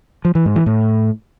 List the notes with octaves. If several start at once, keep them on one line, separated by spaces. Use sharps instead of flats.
F3
E3
G#2
E3
A2